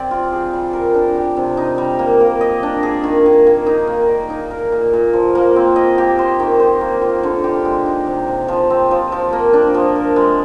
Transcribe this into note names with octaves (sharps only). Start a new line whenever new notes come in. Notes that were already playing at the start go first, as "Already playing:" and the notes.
Already playing: C3 C4 D5
F4
G#4
G3
A#4
D4
G4
C3
D#4
G3
A#3
A#3
D#5
D4
G#4
D#3
D#3
A#3
D#4
A#3
D5
D#4
A#4
A#2
A#2
F3
A#3
C4
D#5
G4
C5
D#3
C5
A#3
F4
D3
G4
G#3
D#4
C3
C3
F3
C4
F3
F3
A#3
D4
F3
A#4
G#3